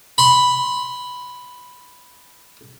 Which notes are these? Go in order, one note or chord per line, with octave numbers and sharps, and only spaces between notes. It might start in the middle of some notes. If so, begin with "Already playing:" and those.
B5 C6